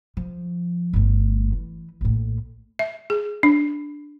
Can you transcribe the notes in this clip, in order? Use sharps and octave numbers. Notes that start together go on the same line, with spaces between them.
F3
G1 A3
E3
A#1 A2
E5
G#4
D4